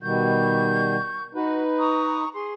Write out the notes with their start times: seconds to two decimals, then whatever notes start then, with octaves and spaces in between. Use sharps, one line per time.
0.03 B2 D#3 G3 C#6 G6
1.35 D#4 F#4 B4
1.78 A#5 C#6 D#6
2.33 G#4 C6